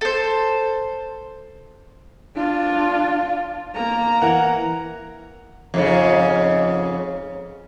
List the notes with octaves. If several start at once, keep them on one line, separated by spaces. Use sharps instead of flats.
A4 C5
D4 F4
A#3 A#5
E3 A#4 F#5
F2 G#2 C#3